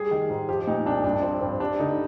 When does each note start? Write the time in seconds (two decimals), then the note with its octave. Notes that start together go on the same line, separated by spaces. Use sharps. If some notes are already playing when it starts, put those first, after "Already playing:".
Already playing: G3 G#4
0.11 D#3
0.30 G#2
0.49 F3 G4
0.67 A#2 D#4
0.85 C2 D4
1.04 G2 D4
1.23 F3 C4
1.41 G2 C4
1.60 G3 D4
1.79 D3 D#4